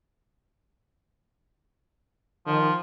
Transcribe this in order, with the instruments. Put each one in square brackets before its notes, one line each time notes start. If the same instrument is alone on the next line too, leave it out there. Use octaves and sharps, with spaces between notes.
[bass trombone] D#3 [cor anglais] F3